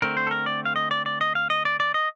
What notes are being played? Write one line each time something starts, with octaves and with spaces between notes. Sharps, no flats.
D3 A3 C4 A#4
C5
A4
A#4
D5
F5
D#5
D5
D5
D#5
F5
D#5
D5
D5
D#5